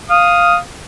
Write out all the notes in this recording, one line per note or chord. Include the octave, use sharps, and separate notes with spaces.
F5 D#6